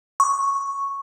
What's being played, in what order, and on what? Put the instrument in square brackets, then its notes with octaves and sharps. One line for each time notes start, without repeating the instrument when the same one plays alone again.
[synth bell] C#6